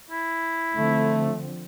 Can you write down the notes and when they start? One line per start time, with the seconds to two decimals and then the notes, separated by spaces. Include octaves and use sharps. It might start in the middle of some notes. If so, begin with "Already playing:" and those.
0.10 E4
0.76 D3 F3 A3 C4